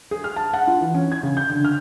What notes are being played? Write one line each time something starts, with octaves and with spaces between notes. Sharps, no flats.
G#4
F6
A5
F#5
F4
E3
C#4
G#6
C#3
G6
D3
F6